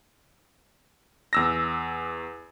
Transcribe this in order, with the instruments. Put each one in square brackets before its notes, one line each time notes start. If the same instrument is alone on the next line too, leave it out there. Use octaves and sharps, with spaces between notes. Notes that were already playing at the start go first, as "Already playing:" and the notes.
[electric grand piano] E2 E6 A#6